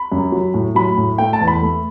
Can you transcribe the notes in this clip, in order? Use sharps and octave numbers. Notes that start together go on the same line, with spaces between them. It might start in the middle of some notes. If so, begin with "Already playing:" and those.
Already playing: B5
F#2
F#3
A2
F#3 B5
A2
A3 G5
A5
E2
B5
A3